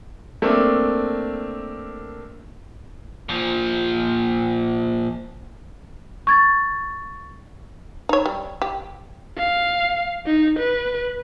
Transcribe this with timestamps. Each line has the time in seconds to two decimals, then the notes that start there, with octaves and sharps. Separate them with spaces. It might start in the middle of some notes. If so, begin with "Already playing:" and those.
0.42 A3 A#3 C4 D4
3.29 A#2 F3
6.27 C#6 G#6 A6
8.09 D#4 C#5
8.26 G3
8.62 G4
9.38 F5
10.26 D#4
10.59 B4